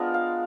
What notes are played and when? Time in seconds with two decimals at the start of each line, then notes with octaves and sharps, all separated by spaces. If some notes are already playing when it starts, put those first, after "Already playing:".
Already playing: G#3 B3 D4 F4 A#4
0.14 F5